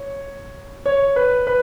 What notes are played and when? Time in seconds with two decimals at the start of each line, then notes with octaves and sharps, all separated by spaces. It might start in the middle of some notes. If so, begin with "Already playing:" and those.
Already playing: C#5
0.86 C#5
1.16 B4
1.47 B4